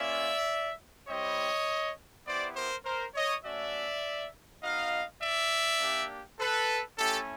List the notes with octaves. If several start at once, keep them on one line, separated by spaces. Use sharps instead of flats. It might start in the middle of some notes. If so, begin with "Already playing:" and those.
Already playing: A#3 C#4 F4 D5 E5
G3 C4 E4 G4 C#5 D#5
B3 E4 G4 C5 D5
A#4 C5
A#4 C5
C#5 D#5
A3 C#4 F#4 D5 E5
B3 D#4 F#4 D#5 F5
D5 E5
A#3 D4 G4
A4 B4
A3 C#4 E4 G4 A4